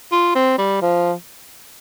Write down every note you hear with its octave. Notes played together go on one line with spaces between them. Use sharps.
F4
C4
G3
F3